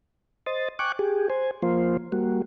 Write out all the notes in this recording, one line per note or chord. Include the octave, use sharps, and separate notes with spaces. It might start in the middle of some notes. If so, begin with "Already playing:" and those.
C5 D#5 A6
G5 G#5 C#6 D6 F#6
G4 G#4
C5 G#5
F3 A#3 F4 C5
G3 A#3 F#4